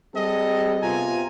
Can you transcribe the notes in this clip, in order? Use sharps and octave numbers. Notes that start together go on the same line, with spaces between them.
G3 C4 G#4 A4 D#5
C3 B3 F4 G#5 A#5